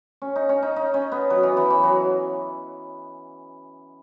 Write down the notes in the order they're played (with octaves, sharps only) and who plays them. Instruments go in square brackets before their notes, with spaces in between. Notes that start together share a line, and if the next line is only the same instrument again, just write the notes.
[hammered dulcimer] C#4
D#4
C#4
D#4
D#4
C#4
B3
F#3
E3
E3
E3
F#3